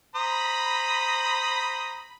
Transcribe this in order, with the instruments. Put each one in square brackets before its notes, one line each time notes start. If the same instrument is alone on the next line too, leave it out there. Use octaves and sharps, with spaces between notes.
[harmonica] C5 A#5 D#6 [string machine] B5